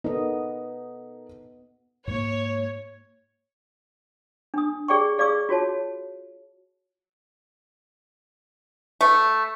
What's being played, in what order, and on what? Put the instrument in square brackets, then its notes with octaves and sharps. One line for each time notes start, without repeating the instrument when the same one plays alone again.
[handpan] B3 D#5 [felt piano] D#4 A4 A#4
[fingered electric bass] G#2 A#3 [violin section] C#5
[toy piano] D4 D#6
G4 G#4 D5 G5 C#6
G#4 D5 F5 C#6 D6 E6
F4 F#4 C#5 A5
[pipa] A3